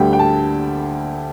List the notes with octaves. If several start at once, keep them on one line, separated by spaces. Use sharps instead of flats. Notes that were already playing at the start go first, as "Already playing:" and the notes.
Already playing: D2 D3 G3 G5
G5
A5